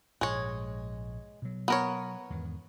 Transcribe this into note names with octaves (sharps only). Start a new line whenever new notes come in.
A#1 G#2 G#3 C#5
B2 F#3
B3 A#4 C#5
E2 G#2 D#3